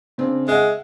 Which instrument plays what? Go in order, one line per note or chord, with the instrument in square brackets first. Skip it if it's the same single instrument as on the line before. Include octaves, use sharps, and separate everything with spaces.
[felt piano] C#3 C4 D4
[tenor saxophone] G#3 [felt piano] E5 F#5